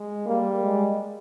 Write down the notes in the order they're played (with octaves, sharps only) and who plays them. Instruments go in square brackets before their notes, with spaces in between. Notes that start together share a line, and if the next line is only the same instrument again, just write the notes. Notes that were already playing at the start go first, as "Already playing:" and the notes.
Already playing: [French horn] G#3
[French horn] G3 [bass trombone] A#3
[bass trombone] G#3